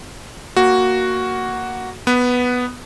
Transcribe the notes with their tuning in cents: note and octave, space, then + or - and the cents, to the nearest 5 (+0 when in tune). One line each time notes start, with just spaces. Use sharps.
A#3 +0 F#4 +0
B3 +0 B4 +0